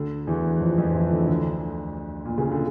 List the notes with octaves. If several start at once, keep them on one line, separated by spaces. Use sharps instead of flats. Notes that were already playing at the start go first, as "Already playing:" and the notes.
Already playing: D2 D3
E2 E3
F2 F3
F2 F3
F3
E2 E3
D2 D3
D2 D3
A#2
C#3
D3